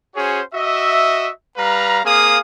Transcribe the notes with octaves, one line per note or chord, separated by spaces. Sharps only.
C#4 F#4 G#4 C5 C#5
F#4 D#5 E5
G3 B4 F5 A#5
A#3 C4 G#4 F5 D#6